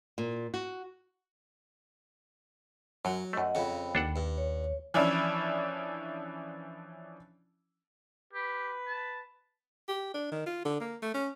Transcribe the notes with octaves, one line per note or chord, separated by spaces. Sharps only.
A#2
F#4
F#2 F#3
F#2 A3 D#5 F#5
F2 C#3 G5 B5
D#2 D4 A4 F#5
G2
C#5
E3 F3 C#4 D4 E4
G4 B4
A5
G4
D4
D#3
F4
D3
A#3
A3
C#4